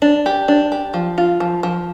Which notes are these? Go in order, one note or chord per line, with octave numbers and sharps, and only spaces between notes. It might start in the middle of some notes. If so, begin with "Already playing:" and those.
D4
G4
D4
G4
F3
F4
F3
F3